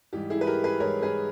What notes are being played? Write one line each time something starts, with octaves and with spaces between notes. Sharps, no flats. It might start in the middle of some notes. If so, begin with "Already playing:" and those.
G#2 E3 G3 G4
E4 G#4
B4
G4 A#4
G#4 B4
G#2 E3 G3 A#4 C#5
G#4 B4